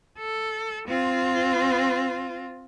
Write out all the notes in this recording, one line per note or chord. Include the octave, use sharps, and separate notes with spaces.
A4
C4 F4